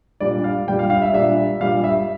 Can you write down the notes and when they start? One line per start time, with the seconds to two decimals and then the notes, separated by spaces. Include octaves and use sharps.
0.20 A#2 G3 D4 D5
0.44 F5
0.67 A#2 G3 D4 G5
0.79 F5
0.90 F5
1.02 E5
1.13 A#2 G3 D4 E5
1.60 A#2 G3 D4 F5
1.84 E5